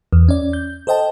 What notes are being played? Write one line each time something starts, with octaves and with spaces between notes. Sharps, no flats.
E2
C#4 D5
G6
A4 C5 D#5 G5 A5